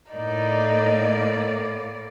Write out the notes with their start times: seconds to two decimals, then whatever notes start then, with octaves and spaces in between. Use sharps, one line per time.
0.11 A2 A#3 D#4 D5